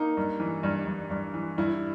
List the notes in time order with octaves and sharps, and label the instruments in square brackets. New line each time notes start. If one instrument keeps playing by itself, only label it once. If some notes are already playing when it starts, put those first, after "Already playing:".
Already playing: [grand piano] A#3 [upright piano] D#4
[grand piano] G2
E3
G2
G2
G2
E3
[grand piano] G2 [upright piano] E4